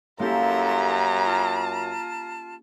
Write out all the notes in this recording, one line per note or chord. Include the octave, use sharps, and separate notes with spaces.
F#2 A#3 C#4 E4 G4 A4 A#5 C6
F4 A5